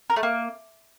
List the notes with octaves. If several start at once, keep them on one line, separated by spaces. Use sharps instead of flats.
A#4
A3
A#3